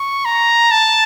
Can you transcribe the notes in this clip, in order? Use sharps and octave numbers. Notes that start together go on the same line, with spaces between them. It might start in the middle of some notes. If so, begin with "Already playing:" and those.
Already playing: C#6
A#5
A5